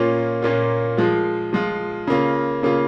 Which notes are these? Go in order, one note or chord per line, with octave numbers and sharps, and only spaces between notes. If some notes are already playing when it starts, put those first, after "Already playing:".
Already playing: A#2 A#3 C#4 F4
A#2 A#3 C#4 F4
F3 G#3 F4
F3 G#3 F4
C#3 A#3 F4
C#3 A#3 F4